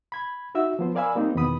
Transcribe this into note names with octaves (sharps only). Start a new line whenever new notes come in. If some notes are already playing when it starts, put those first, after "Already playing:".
B5 G#6
D#4 F#4 E5 E6
F3 B3 C5
A#4 D5 F5 G#5 B5 E6
G3 A#3 C4 D#4
E2 B2 D#3 B3 B5 D#6